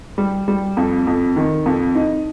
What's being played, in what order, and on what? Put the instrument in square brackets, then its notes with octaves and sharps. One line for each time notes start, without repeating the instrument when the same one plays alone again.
[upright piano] G3
G3
F2
F2
D#3
F2
D#4